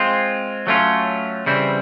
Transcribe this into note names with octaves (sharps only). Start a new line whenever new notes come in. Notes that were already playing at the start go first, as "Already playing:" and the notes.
Already playing: G#3 C4 F4
F#3 A3 C#4 F4
C#3 E3 G3 C4 E4